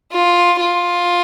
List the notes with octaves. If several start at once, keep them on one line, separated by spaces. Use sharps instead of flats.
F4
F4